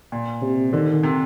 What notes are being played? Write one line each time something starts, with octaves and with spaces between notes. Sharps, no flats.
A#2
C3
D3 D#3
C3